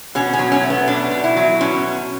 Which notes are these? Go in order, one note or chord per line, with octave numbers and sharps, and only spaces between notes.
B2 C#4
C#4
F#3
C#4
A3
B3
B2 D4
B2
E4
F#3
B2 C#4